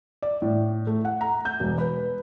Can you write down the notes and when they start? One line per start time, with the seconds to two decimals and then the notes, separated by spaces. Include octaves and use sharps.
0.22 D5
0.42 A2
0.87 A3
1.05 F#5
1.21 A#5
1.45 G6
1.60 E1
1.78 B4